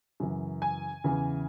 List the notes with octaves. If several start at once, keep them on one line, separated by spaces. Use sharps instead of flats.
F#2 C#3 E3
G#5
E2 C#3 E3